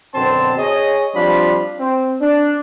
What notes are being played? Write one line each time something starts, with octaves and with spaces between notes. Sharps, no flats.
F#2 B2 D3 C4 A5 C6
G#4 C#5 D#5
F3 G3 C4 D4 F4 B5
C4
D4